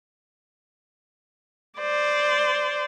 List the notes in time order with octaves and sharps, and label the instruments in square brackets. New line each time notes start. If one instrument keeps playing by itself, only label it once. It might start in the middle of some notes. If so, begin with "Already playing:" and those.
[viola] C5 D5